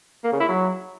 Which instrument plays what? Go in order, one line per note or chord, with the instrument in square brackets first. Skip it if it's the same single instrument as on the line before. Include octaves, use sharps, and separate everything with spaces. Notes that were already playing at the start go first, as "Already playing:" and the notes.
[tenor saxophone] A#3
C#3
E4
F#3